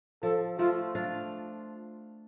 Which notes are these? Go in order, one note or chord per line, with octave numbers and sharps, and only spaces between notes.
F3 A4
F3 A3 F4
D4 F4